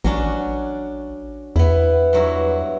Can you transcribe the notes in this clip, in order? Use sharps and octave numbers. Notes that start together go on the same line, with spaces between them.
A1 F#3 C#4 D4
E2 B3 E4
G2 F#3 E4